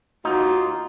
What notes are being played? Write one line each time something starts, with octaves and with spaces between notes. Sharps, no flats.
D#2 A#3 D#4 F4 F#4